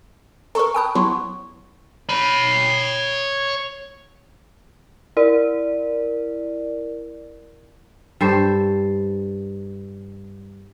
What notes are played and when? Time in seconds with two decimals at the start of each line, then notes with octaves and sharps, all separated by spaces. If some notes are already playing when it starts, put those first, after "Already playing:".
0.55 A4 A#4 A#5 C#6
0.74 G5 A5 B5 D#6 F#6
0.95 F#3 B3 E4 C6 C#6
2.09 C#5 B5
5.17 E4 A#4 D5
8.21 G2 A4 C5